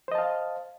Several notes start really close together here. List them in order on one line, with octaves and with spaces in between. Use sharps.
C5 D#5 A5 F5